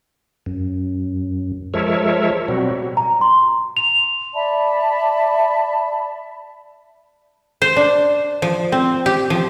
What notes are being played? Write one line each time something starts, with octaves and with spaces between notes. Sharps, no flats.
F#2
F3 G#3 A4 A#4 C#5 E5
B2 F#3 G3 C4 F#4
A#5
C6
F7
D5 E5 A5 B5
C5
D4
F3
C4
G4
F3